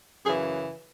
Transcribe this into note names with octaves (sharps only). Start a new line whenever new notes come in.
F#2 C#3 E3 G#4